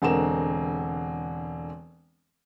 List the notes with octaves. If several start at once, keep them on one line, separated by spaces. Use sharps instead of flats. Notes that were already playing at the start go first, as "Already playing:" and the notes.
E1 D3 G#3 C4 A#4 E7